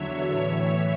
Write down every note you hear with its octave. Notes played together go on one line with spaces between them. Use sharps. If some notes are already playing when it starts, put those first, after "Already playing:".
Already playing: E2 D3 F#3 C#5 E5
A2 E3